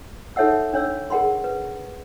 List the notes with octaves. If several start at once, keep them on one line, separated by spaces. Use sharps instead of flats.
D#4 A4 C#5 E5 F#5 E6
D4 C#5 E6
G#4 A#4 F#5 B5 C6
B4